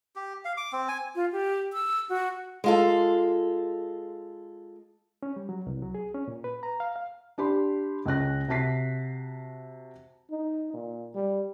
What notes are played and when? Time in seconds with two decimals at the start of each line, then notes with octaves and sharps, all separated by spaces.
0.16 G4
0.45 F5
0.57 D6
0.72 C4
0.88 G#5
1.15 F4
1.32 G4
1.73 E6
2.09 F#4
2.64 G#3 F4 A4
5.23 C#4
5.36 G3
5.49 F#3
5.67 C2
5.83 F#3
5.95 G#4
6.14 C#4
6.28 A#2
6.44 B4
6.63 A#5
6.80 F5
6.96 F5
7.38 D4 G4 B5 C6
8.06 C#2 C#4 F#6 A#6
8.48 C3 F#4 A5 B6 C7
10.31 D#4
10.74 A#2
11.15 G3